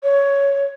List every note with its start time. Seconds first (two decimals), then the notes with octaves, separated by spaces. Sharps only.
0.04 C#5